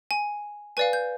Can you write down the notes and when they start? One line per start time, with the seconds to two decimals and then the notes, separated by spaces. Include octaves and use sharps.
0.11 G#5
0.77 B4 D5 F5 G#5
0.93 G6